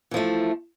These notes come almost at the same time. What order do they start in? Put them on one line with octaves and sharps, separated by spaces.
E3 F3 A3